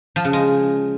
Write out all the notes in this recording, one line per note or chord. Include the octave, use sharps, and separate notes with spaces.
F3
C#3
G#3